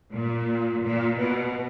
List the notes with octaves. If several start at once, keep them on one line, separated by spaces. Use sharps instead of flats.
A#2
A#2
B2